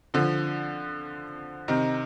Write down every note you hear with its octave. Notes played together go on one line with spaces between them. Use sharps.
D3 F3
C3 D#3